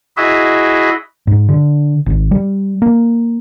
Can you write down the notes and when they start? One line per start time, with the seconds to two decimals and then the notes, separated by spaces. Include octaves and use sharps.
0.17 E4 F#4 G#4 D#5 E5
1.27 G#2
1.49 D3
2.06 G#1
2.31 G3
2.82 A#3